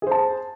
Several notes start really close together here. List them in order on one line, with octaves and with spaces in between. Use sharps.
G#4 C5 A5